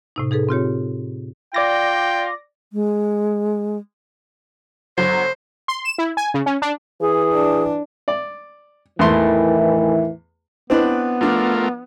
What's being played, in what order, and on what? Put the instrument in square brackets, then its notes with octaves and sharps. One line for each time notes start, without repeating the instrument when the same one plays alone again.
[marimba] A2 C3 D#4
D#4 G#4 A4 B4
C4 F4 G4 C#5
[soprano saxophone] F4 [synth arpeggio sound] D5 D6 A#6 [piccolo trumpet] G5
[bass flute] G#3
[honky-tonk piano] G1 F#3 [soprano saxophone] C5
[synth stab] C6
E7
E4
G#5
C#3
C#4
D4
[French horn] E3 [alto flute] G#4
[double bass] D4
[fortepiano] D5
[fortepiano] E2 A3 C6 [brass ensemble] A2 D#3 E3
[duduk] B3 [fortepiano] C4 D4 B4 [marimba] E4 D#5
[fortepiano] F3 D4 [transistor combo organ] A3 F4 A#4